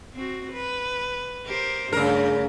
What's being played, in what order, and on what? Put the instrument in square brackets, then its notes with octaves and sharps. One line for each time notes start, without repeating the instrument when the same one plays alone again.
[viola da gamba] C4 F#4
B4
G4 A#4 C5
[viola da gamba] G2 A3 [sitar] C#3 A#4